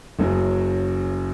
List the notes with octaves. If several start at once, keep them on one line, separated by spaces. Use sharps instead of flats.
F#1 F#2 C#3 F#3